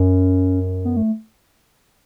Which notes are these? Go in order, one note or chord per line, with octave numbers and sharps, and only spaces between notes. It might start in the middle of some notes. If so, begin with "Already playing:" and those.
Already playing: F#2 C#4
B3
A3